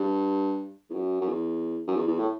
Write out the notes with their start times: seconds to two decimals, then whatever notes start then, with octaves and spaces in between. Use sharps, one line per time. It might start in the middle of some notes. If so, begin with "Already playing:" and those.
Already playing: G2
0.90 E2
0.94 F#2
1.21 F#2
1.28 E2
1.87 F#2
1.96 E2
2.07 E2
2.19 A2